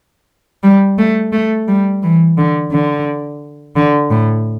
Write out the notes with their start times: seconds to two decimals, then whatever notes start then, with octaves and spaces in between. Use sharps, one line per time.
0.63 G3
0.98 A3
1.32 A3
1.68 G3
2.03 E3
2.38 D3
2.72 D3
3.76 D3
4.10 A2